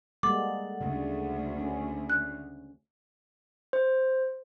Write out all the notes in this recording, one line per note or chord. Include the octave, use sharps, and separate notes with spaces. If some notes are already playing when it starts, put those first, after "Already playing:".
G3 G#3 A#3 A4 F#5 D6
D2 C#3
C#4
F#6
C5